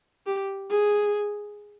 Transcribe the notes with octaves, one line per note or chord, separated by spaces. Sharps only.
G4
G#4